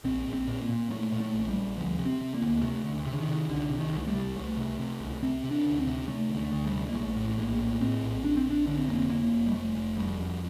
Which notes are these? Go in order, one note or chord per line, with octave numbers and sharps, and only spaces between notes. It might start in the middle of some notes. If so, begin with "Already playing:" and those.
A#1 C4
A#1
C4
A#2
A#3
A#2
A#2 A3
A#2
A3
A#1
A3
G3
A#1
D2 F3
C3
C4
C3
A#3
D2
C3 A3
D2
C3
D3
D#3
C3
C2 D3
C3
D#3
C2
A3
G3
C3
C2 A3
C3
C3
C2
C3 C4
C3
D4
D2
C4
C3
C3 A3
D2
A3
D2
G3
C3
A#3
A#1 A3
A2
A#1 A#3
A2
A2 C4
A#1
A#1 D4
C4
A#1 D4
D3 D4
C4
F1 A#3
C4
F1 A#3
F1
G3
F1 A3
F1
F2 G3
F2